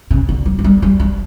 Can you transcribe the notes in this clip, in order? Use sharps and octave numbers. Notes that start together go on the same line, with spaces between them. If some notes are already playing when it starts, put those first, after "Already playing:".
C#3
D3
F#3
F#3
G3
G3
G3